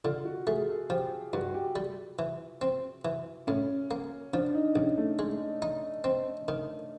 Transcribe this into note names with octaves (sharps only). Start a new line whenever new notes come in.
D3 F4
F#4
A3 G#4
A4
F3 G4
G2 F#4
G4
G3
E3
C4
E3
A2 C#4
A#3
F3 D4
D#4
A#1 C#4
A3
G#3
D#4
C4
D#3